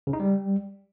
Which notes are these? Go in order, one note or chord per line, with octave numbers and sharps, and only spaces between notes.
C#3
D#4
G3